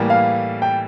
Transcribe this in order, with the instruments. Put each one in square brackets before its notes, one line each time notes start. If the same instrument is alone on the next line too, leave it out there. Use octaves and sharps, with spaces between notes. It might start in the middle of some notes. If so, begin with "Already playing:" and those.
Already playing: [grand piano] A2 E3 G3 A#3
[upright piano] F5
G5